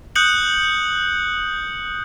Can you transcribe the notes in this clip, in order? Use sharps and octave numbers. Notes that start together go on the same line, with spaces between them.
D#6 F#6 G6 C#7 F#7